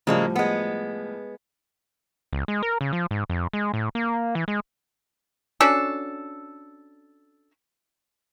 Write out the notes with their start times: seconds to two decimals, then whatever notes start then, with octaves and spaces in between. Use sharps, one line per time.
0.07 A2 C#3 F3 G3 G#3 A#3
0.36 G#3 B3
2.33 C#2
2.48 G#3
2.63 A#4
2.81 C#3
2.93 F3
3.11 G#2
3.30 F2
3.53 G#3
3.74 A2
3.95 A#3
4.35 E3
4.48 G#3
5.60 C#4 D4 F#4 A4